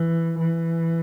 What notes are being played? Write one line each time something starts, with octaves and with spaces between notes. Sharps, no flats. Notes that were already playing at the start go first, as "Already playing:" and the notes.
Already playing: E3
E3